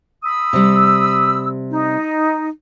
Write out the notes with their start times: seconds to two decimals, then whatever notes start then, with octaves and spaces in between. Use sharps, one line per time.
0.23 B5 D#6 E6
0.53 C3 G3
1.71 D#4